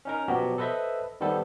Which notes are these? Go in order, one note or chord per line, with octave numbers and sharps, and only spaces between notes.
C#4 D#4 A#4
B2 F3 F#3 B3 F#4 G4
A4 B4 C5 D#5 E5
D#3 G3 B3 A4 C5